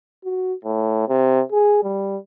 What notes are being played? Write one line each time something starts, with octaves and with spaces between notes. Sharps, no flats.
F#4
A2
C3
G#4
G3